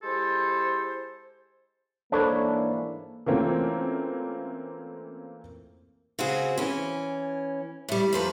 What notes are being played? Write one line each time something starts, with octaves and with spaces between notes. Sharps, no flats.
G#3 E4 G4 A4 C5
G#2 E3 A#3 D4 A4 C5 C#5 B5
E3 A3 A#3 C4 C#4 F4
C#3 C4 F#4 G#4
E3 C#4
A2 G3
F2 F3 B4 A#5